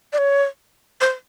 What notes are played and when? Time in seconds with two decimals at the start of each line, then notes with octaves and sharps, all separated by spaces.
0.13 D5
0.18 C#5
1.01 C5